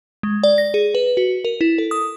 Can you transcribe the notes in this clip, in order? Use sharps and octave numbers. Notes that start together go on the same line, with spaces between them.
G#3
D5
A#6
G#4
B4
F#4
A#4
E4
A4
D#6